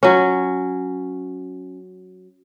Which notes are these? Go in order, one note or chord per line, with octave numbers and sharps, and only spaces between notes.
F#3 C#4